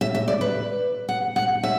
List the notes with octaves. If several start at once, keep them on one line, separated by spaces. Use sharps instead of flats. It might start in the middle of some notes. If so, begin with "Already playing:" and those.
E5
E5
D5
B4
F#5
F#5
E5